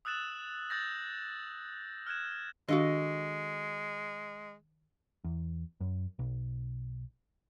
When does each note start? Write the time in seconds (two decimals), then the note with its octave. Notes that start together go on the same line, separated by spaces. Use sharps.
0.05 D#6 E6 F#6 A6 E7 F#7
0.70 D#6 E6 G6 A6 A#6
2.07 F6 F#6 G#6 E7
2.68 D#3 G#3 D4 F#4 A4 D#5 F5
5.24 E2
5.80 F#2
6.19 B1